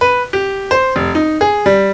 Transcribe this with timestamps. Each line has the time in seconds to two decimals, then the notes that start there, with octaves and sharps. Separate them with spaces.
0.01 B4
0.33 G4
0.71 C5
0.96 F1
1.15 D#4
1.41 G#4
1.66 G3